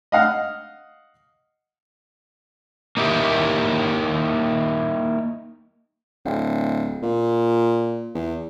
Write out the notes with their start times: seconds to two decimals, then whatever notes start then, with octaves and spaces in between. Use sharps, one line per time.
0.12 D#5 F5 F#5 F6
2.97 A#3 D#4 E4 G4
6.25 D1
7.02 A#2
8.14 E2